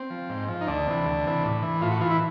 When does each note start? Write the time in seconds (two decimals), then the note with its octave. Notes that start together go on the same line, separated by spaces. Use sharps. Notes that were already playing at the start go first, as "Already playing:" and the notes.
Already playing: C4
0.10 F3
0.29 G#2
0.49 F3
0.61 D#4
0.67 D2 D4
0.86 C3 E3
1.06 D2
1.25 C3 E3
1.44 A2
1.63 E3
1.81 A2 F4
1.91 F#4
2.00 E3 F4
2.10 E4